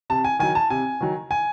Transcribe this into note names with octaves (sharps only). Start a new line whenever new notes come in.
C3 A5
G#5
D#3 F#3 G#5
A5
C3 G#5
D#3 F#3
G#5